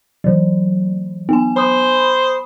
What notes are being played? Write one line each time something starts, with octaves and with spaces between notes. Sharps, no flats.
E3 F#3
B3 G#5
C5 B5 D#6